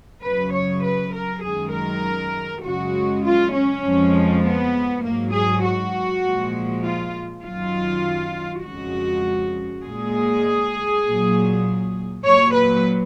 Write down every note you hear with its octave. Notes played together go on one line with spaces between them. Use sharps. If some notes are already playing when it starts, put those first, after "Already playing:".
F#2 C#3 F#3 B4
C#5
B4
A#4
F#2 D#3 G#3 G#4
A#4
F#2 C#3 G#3 F#4
F4
C#4
F2 F3 G#3
B3
G#2 F#3 A#3
G#4
F#4
A#2 F3 G#3
F4
F#2 D#3 F#3 F4
F2 C#3 G#3 F#4
A#2 G#3 G#4
A#2 F#3
A#2 F#3 C#5
B4